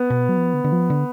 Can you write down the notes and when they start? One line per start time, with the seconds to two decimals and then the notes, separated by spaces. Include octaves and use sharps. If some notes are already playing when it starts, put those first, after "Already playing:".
Already playing: B3
0.10 B2
0.29 F#3
0.37 F3
0.54 D3
0.64 D3
0.72 F3
0.90 D3